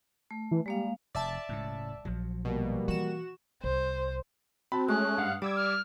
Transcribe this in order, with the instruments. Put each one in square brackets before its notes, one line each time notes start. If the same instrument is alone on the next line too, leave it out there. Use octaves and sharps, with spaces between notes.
[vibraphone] A3
[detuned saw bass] E3
[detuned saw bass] G3 [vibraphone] G#3 A#3 F5
[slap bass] F1 [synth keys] D5 E5 A5
[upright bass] E1 G#3 [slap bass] A2 C#3
[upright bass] A#1 [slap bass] F3 F#3
[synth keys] B2 [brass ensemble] G3 A#3
[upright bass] E3 [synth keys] F#4 E7
[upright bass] C2 [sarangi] C5
[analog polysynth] C4 [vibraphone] F#4 [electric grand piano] A5 B5
[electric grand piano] G#3 [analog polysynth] A3 C#4 [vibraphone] D#6 [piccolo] F#6
[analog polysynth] G2 F5 F#5
[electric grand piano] G3 [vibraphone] D5 [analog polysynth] D6 E6 G#6
[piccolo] F6